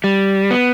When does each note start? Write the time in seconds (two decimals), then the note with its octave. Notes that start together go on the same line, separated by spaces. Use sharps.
0.04 G3
0.51 B3